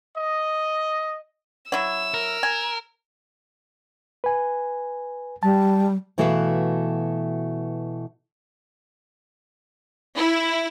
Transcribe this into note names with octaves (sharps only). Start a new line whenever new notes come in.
D#5
F#3 E4 E6
A#4
G#5
B4 G#5
G3 A5
B2 E3 A3 F#4 B4 F5
E4